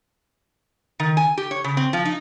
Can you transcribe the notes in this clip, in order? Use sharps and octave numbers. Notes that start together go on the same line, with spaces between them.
D#3
G#5
G4
C#5
C#3
C4
F3
D#4